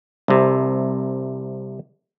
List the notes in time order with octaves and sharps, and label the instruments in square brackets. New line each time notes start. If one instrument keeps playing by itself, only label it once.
[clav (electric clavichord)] C2 C3